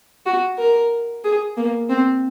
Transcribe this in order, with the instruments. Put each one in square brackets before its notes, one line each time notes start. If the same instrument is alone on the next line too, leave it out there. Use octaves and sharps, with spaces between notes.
[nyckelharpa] F#4
A#4
G#4
A#3
C4